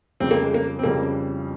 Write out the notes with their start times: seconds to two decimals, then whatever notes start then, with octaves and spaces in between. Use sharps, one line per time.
0.20 F2 C#3 G3 C4 C#4
0.31 A#3
0.42 G#3
0.54 A#3
0.79 C4
0.83 F2 C#3 G3 A#3 C#4